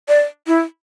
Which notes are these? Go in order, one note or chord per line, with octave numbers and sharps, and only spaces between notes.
D5
E4